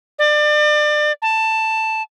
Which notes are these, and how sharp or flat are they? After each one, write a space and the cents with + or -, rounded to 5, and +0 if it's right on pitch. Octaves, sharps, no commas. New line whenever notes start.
D5 +30
A5 +10